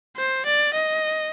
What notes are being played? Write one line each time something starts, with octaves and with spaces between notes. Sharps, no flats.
C5
D5
D#5